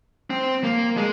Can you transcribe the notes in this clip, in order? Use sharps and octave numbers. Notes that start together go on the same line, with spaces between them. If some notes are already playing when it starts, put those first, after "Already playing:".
C4
A#3
G#3